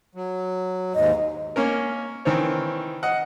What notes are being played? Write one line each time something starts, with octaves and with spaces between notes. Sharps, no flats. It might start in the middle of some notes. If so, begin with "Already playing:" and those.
F#3
D#2 G#2 D#5
A#3 C#4 A#4
D#3 E3 C4 C#5
D#5 F#5